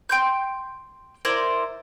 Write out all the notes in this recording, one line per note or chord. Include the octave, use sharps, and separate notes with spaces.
G5 C6 G6
E4 A#4 C5 D5